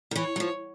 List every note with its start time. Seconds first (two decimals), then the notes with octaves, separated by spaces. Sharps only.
0.11 D#3
0.15 E3 C#5
0.36 F#3
0.40 F3